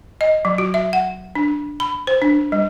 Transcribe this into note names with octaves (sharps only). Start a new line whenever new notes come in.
D#5
F#3
F#4
E5
F#5
D4
B5
C5
D4
G3